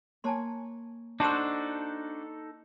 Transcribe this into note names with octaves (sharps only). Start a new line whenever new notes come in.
A#3 C#5 G#5 A5 C6 F#6
D4 D#4 F#4 A4 C5 A5 E6